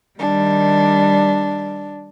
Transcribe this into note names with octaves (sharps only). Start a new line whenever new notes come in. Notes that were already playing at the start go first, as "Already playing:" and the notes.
D#3 G3 D4